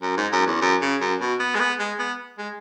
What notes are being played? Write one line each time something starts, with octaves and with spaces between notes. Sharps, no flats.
F#2
G#2
F#2
E2
F#2
C#3
F#2
B2
B3
G#3
B3
G#3
B3
G#3